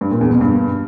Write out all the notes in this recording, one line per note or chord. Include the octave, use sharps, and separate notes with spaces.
G2
A#2
E2
B2
G2